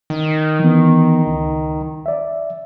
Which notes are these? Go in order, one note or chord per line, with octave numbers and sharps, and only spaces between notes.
D#3
E3 B3
C#2 D#4
D5 E5